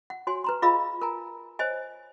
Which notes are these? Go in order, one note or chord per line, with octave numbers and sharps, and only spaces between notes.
F#5
F#4 C#5 G#5 C6
B4 A#5 C6
F4 G#4 D#5 F5 B5 E6
A#4 G#5 A#5
C5 C#5 D#5 G#5